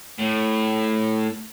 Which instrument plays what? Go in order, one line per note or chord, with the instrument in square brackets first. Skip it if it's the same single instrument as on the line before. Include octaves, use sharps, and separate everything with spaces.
[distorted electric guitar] A2